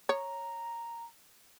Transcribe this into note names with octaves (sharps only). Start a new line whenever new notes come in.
C#5 A#5